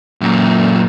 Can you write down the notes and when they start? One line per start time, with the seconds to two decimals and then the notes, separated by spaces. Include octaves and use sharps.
0.21 F#2 A#2